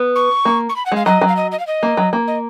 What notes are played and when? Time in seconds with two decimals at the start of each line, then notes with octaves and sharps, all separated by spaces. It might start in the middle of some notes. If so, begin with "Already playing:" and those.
Already playing: B3
0.16 C#6
0.45 A#3
0.69 C#6
0.76 B5
0.86 F#5
0.92 G#3 F5
1.06 F#3 D#5
1.21 F#3
1.28 F5
1.37 D#5
1.52 D#5
1.59 F5
1.67 D#5
1.83 A#3
1.97 F#3
2.13 A#3
2.27 D#5